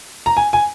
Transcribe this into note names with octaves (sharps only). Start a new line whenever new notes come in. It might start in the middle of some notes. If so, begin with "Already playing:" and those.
A#5
G#5
G#5